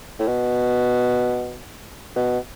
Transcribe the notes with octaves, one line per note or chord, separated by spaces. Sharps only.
A2
B2
B2